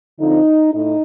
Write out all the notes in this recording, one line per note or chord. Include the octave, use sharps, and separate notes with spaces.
D3 F3 C4 D#4
A2 D#4